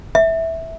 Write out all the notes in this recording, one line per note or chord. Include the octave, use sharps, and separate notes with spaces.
E5